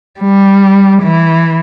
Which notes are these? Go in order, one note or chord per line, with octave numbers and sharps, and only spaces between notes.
G3
E3